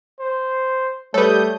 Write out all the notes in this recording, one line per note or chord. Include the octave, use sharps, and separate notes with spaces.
C5
G3 A3 A4 B4 C#5 D#6 G6